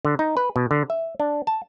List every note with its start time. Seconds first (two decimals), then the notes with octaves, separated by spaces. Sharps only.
0.05 D3
0.19 D#4
0.37 B4
0.56 B2
0.71 D3
0.90 E5
1.20 D4
1.47 A5